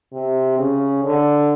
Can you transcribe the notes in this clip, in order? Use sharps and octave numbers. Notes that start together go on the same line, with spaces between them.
C3
C#3
D3